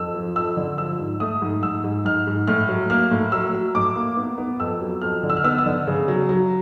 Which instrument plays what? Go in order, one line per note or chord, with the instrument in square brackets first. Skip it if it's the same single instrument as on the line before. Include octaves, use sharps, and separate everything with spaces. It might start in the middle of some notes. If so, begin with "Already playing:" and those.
Already playing: [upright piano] F2 E6
F3
F2 E6
D3
F3 E6
G#2
A3 D#6
G#2
G#2 E6
G#2
G#2 F6
G#2
A2 F6
F#3
A#3 F6
A2
F#3 E6
F#3
A2 D6
A#3
B3
B3
F2 E6
F#3
F2 F6
D3
E6
F6
B3 E6
E6
D3
C#3
F#3
F#3